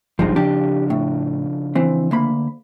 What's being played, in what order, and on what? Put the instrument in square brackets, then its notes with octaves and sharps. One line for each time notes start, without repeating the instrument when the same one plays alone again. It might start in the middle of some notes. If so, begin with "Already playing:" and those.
[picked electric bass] F#1 B1 G2 [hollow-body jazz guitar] F3 G#3 D#4
[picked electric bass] C#3 F3 D4 [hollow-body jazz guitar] G4
[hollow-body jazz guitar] A2
E3 C4
D2 A#3 B5